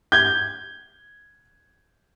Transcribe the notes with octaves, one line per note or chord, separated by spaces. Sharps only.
G6 G#6